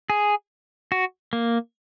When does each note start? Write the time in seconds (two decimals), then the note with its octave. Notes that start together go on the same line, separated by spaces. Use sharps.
0.10 G#4
0.92 F#4
1.33 A#3